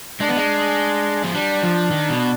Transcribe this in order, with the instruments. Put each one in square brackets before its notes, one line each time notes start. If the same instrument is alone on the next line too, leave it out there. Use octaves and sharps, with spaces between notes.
[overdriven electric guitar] G#3 [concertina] D4
[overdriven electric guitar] B3
G#3
F3
[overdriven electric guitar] G3 [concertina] D4
[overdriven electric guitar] F3
D#3
B2